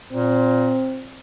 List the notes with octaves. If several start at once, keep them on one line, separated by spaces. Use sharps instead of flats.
A#2 C4